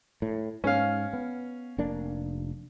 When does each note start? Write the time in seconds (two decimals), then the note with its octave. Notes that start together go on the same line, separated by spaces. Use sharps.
0.22 A2
0.64 G#2 C#4 F5
1.13 B3
1.78 F1 A#3 D4